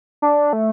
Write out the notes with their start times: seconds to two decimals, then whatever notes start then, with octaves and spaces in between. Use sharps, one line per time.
0.22 D4
0.53 A3